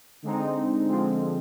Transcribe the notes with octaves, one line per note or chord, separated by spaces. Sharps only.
D3 G#3 C4 D#4
D3 F3 G#3 C4